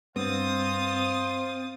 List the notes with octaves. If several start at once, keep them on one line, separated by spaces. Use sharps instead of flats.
G2 B3 C4 C5 F5 D#6 A6